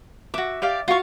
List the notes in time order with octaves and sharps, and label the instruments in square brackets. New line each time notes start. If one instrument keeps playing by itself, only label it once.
[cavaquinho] F#4 D6 [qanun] E5
[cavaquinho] G4 D5 F5
[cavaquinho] F4 C#6 [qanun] F#4 F5